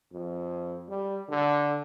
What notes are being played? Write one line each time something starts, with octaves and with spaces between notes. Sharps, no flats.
F2
G3
D3